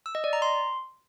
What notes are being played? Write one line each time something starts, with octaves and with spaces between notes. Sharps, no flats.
E6
D#5
D5
A#5
C6